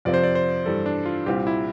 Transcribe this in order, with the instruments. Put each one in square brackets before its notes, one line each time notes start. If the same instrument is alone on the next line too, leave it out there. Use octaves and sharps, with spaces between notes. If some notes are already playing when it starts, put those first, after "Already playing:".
[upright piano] F2 C3 F3 C4 F4 [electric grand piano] D5
[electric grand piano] C5
D5
C5
[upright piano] G2 E3 G3 [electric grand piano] A4
[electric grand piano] D4
F4
[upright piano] C2 A#2 G3 C4 F4 [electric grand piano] G4
[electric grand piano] E4